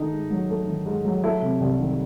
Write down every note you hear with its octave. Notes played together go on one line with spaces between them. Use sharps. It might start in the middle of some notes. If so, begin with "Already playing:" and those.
Already playing: D#3 A3 D#4
G#2
F#3
A3
D#3
G#2
F#3
A3 E4
C3
C2
D#3